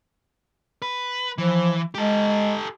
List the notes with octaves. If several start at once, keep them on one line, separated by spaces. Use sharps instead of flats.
B4
E3 F3
G#3 G4 A4